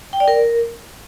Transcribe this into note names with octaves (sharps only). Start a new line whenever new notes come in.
G5
D5
A#4